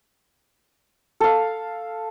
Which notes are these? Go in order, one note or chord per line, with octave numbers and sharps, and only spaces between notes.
A4 F5